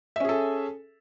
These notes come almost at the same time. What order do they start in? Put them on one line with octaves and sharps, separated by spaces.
E5 C#4 G#4 A4